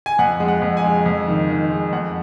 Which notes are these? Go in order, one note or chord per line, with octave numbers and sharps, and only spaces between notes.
G#5
F2 F#5
G#3
F#5
F2
G#5
G#3
F2
D#3
D#3
G#3
F2 F#5